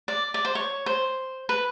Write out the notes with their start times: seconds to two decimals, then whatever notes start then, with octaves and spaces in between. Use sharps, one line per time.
0.08 D5
0.34 D5
0.45 C5
0.55 C#5
0.86 C5
1.49 B4